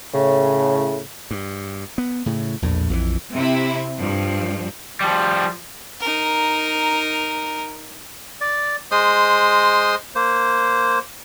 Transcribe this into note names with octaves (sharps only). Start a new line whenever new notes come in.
A2 C#3
G2
B3
A2 C#3
A#1 E2 A2
A#1 F2 D3 E3
C3 E4
G2 F3
F3 G3
D#4 A#4
D5
G#3 C5 C6 D#6
A#3 C5